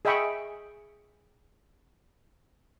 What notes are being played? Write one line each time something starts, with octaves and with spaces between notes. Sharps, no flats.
G#4 D#5 E5 G5 B5 C#6